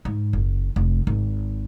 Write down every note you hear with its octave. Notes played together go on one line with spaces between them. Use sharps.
G#2
F#1
F1
G#1